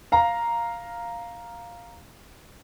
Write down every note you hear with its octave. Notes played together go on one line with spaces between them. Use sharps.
F5 A#5